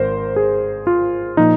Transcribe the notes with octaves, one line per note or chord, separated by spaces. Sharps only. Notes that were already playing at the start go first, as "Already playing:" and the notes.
Already playing: G#1 A#4 C5
G#4
F4
A#2 F3 D#4